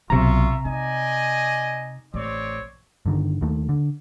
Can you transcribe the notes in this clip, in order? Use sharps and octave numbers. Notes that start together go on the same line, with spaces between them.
B1 C3 B3 F4 E5 A#5 C#6
D#4 D5 D#5 G#5
A1 C4 C#5 D5
G2 D3 D#3
D#2 D#3 A3
D3